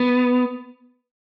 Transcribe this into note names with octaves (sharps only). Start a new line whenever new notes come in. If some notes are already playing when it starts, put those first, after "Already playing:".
Already playing: B3